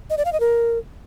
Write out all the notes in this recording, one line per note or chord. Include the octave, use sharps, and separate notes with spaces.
D#5
D5
F5
D#5
A#4